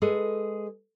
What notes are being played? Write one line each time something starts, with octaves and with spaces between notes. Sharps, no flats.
G#3 G#4 A4 B4